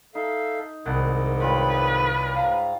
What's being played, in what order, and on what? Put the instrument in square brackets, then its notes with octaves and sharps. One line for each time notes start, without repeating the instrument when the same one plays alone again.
[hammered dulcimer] D#4 [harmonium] A4 E5 F5
[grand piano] C2 [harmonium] G#2 D#3 [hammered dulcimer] F#5
[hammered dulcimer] G3 F4 C#5 [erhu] B4
[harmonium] G#2 [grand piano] F5 A#5